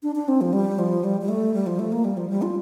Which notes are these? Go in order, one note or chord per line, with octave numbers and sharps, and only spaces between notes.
D4
D4
C4
F3
G3
F3
G3
G3
A3
G3
F3
A3
A#3
G3
F3
G3
F4